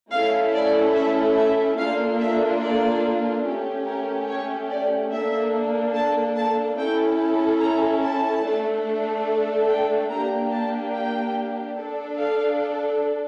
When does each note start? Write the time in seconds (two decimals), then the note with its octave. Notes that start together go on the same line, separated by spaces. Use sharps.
0.11 A3 C#4 E4 A4 F5
0.52 D5
0.94 E5
1.36 E5
1.77 A#3 D4 F4 A4 F5
2.19 E5
2.61 D5
3.44 A3 C#4 G4
3.86 A#4
4.27 C#5
4.69 D5
5.10 A#3 D4 A4 E5
5.94 A5
6.35 A5
6.77 C#4 E4 A4 G5
7.60 A#5
8.01 A5
8.44 A3 D4 A4
9.68 G5
10.09 A#3 D4 G4 A#5
10.51 A5
10.93 G5
11.76 D4 A4
12.18 F5